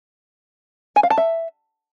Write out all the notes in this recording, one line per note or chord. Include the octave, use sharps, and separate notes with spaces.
G#5
F5
A5
E5